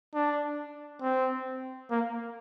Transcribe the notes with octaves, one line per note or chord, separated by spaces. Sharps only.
D4
C4
A#3